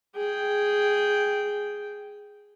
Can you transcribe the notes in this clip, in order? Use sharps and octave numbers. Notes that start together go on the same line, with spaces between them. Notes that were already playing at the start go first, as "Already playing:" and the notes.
G#4 G5